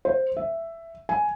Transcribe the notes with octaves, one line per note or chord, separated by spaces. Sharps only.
C5
E5
G#5